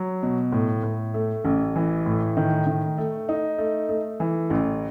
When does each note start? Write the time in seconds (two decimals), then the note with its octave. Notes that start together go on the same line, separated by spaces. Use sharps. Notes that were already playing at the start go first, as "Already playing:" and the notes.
Already playing: F#3
0.23 B2
0.52 A2
0.83 A2
1.14 A3
1.45 A1
1.76 E3
2.06 A2
2.37 D#3
2.67 D#3
2.98 A3
3.29 D#4
3.58 A3
3.89 A3
4.20 E3
4.50 A1